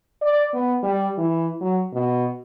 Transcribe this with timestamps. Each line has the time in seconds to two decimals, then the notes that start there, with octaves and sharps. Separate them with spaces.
0.22 D5
0.54 B3
0.83 G3
1.18 E3
1.61 F#3
1.93 B2